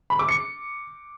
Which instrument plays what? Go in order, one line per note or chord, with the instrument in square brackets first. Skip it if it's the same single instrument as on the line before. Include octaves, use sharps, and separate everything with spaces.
[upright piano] B5
D6
C#7